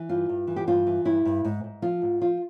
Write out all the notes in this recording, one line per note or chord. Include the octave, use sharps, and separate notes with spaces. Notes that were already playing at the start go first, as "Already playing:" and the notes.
Already playing: E3
G2 F4
G2
E3
G4
G2 F4
E3
G2 E4
G2
G#2
G#2
F3 F4
G#2
F3 F4